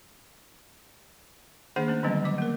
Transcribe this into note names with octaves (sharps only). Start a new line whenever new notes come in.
D#3 A#3 D4 G#4 C5 F#5
A3 C#4
D3 D#3 F#3 G3 B3 C#4
F#3 D6
A#3 A#4